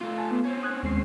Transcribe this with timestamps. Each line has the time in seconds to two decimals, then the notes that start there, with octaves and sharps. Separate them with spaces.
0.01 A3 F4
0.18 G#5 A5
0.31 B3
0.45 C4 C#4
0.63 D#6 F#6 G#6
0.83 D#2 G#3 C7